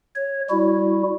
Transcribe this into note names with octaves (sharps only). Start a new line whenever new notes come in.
C#5
G3 E4 F#4